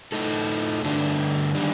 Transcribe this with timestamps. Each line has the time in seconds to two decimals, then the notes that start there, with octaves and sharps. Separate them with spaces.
0.12 A2 A3 D#4 A4
0.84 G2 D3 A3 D4
1.55 D#3 G3 D4